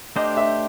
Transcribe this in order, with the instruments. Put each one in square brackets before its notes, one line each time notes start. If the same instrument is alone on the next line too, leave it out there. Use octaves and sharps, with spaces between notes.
[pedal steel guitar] A3 D4 G4 C5 [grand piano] D#5
[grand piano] E5